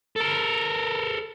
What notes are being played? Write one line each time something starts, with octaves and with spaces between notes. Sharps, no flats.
A4 A#4